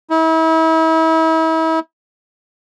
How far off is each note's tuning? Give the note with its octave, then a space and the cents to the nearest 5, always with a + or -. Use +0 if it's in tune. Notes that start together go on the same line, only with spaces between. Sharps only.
E4 -40